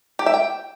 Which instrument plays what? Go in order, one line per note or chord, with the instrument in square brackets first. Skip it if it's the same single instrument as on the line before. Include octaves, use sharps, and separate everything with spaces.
[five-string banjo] G4
E5
G5